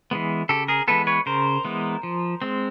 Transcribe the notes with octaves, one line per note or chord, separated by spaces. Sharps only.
E3 G#3 B3
C#3 G4 A4
G#4 A#4
E3 G#3 B3 A4 B4
B4 C#5
C#3 A#4 C5
E3 G#3 B3
F3
G#3 C4